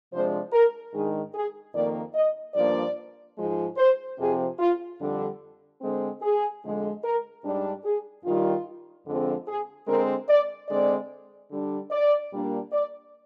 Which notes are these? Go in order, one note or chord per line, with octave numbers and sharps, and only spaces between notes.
C3 F3 G#3 D4 C5
A#4
G#2 D#3 G#3 D4 G#4
G#4
F2 D#3 A#3 D5
D#5
G2 F3 A#3 D4 D5
G#2 F3 G#3
C5
F2 C3 F3 C4 G#4
F4
F2 D3 G3 D4
D3 G#3 C4
G#4
F2 D3 G#3
A#4
G#2 G3 D4
G#4
G2 D#3 G3 F4
F2 D3 F3 G#3 C4
G#4
D3 G#3 C4 A#4
D5
D3 G#3 C4 D5
D3 G3 D4
D5
A#2 G3 A#3 D4
D5